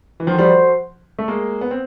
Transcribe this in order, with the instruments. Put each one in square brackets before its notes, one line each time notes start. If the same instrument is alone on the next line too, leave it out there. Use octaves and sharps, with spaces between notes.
[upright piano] E3
[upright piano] D#3 F3 [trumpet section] F#4 A4 C5
[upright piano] F3 G3
A3
G#3 A#3
B3
C4